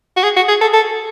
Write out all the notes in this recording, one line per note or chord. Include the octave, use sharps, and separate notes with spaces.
F#4
G#4
F#4
G#4
A4
A4